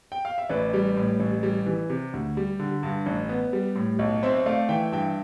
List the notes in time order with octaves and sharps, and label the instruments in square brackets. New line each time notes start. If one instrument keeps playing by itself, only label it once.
[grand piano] G5
F5
E5
A1 B4 D5
G3
A2
A1
G3
E3
C3
D2
G3
D3
G2
A1
B3
G3
A2
B1
C4 C5 E5
A3 D5 F5
E3 E5 G5
G2 E5 G5